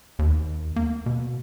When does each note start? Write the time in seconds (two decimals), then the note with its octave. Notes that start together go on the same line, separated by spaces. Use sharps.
0.19 D#2
0.76 A#3
1.06 B2